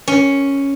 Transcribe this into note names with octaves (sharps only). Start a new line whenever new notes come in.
C#4